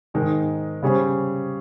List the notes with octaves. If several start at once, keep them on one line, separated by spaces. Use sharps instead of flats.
G#2 D#3 G#3 D#4 A#4
C#3 G3 C#4 G#4 C5